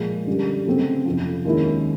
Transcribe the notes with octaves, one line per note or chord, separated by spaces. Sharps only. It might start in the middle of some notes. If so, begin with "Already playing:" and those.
Already playing: A#2 F3 G#3
F#2 D3 G3
C#3 F#3 A3 C4
F2 C3 F3
D#2 D#3 G#3 C#4 E4